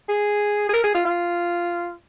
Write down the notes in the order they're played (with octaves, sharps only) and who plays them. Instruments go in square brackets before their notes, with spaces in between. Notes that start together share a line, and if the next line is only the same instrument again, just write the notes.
[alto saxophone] G#4
G#4
A#4
G#4
F4
F4